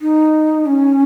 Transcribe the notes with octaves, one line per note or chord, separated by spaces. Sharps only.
D#4
C#4